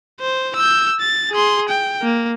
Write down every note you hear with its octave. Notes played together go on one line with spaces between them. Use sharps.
C5
E6 G6
A6
G#4 C6
G5
A#3